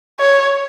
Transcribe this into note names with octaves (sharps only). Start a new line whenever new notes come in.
C#5